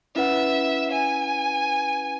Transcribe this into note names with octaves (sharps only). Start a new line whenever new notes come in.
C#4 E4 B4 E5 F#5
G#5